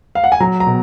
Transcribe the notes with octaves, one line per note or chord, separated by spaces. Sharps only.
F5
F#5
G#5
F#3 A#5
A#5
B2